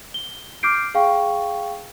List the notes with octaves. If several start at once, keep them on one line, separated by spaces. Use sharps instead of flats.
G7
D6 F6 G6 C7 D7
G#4 F5 G5 C#6